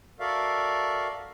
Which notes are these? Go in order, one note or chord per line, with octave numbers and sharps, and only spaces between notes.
F#4 A4 A#4 D5 E5 F5